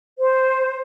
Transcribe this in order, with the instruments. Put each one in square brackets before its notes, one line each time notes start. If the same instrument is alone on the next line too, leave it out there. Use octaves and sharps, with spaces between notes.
[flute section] C5